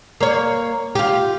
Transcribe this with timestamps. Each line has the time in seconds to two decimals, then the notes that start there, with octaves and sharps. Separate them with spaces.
0.21 A#3 C#5
0.95 F4 G4